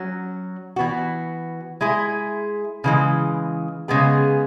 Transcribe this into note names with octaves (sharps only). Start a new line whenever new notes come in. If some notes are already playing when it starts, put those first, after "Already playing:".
Already playing: F#3 C#4 F#4
E3 B3 F#4
G#3 E4 G#4
C#3 E3 G#3
C#3 G#3 B3 G#4